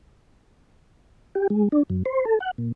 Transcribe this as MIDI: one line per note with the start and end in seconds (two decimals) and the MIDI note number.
1.35 1.47 67
1.50 1.68 56
1.72 1.83 62
1.90 2.03 42
2.05 2.25 72
2.25 2.39 69
2.40 2.51 78
2.58 2.72 46